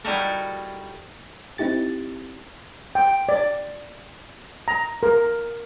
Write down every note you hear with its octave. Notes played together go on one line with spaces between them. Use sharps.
G3 D#4 E4 F#4 A4 A#4
C4 D#4 E4 G4 A6
G5
D5
A#5
A#4